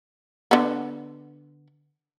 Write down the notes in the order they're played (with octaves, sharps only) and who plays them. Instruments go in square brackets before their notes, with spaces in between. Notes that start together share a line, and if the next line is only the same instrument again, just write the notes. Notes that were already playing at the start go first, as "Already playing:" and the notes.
[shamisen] D3 B3